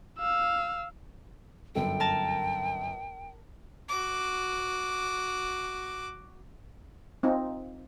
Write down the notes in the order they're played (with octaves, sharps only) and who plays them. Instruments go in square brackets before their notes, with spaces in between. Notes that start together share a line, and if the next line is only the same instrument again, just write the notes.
[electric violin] F5 E6
[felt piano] G1 F#2 A4 [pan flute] G5
[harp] A#4 A5
[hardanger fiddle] F#4 D6
[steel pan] C4 D#4 F4